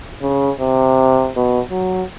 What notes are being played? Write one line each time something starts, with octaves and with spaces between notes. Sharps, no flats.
C#3
C3
B2
F#3